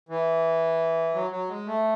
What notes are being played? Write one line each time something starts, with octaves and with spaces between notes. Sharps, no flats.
E3
F#3
F#3
G#3
A3